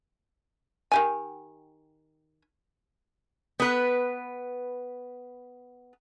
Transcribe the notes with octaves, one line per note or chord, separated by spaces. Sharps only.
D#3 G4 G#5
B3 B4